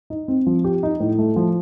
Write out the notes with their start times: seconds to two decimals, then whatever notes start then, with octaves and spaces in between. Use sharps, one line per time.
0.10 D#4
0.28 C4
0.46 F3
0.64 G4
0.83 D#4
1.00 A2
1.18 A3
1.36 F3